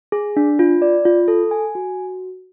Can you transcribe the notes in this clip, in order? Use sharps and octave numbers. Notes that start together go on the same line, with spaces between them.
G#4
D4
F4
D5
F4
A4
G#5
F#4